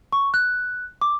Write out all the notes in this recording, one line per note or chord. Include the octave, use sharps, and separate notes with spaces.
C#6
F#6
D6